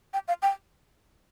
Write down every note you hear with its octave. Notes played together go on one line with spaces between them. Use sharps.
G5
F5
G5